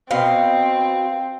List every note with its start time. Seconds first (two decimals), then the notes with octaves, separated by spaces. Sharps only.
0.11 B2 C4 F5